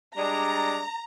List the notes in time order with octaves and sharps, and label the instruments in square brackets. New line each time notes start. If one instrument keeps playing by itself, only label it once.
[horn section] G3 G#3 D4 [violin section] A#5